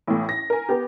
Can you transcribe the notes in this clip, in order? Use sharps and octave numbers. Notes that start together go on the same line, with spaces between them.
A1 A2
A#6
A#4 G#5
B3 G4